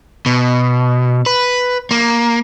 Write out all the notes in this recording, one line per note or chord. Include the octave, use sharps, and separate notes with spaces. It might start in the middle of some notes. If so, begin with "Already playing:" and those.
B2
B4
A#3